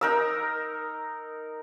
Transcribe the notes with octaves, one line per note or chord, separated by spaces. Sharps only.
D#4 A#4 E6